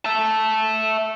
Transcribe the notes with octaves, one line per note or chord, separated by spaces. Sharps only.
E5 A5